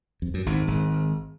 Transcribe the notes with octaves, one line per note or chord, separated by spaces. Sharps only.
F2
F#2
G#1 G#2
G#1 G#2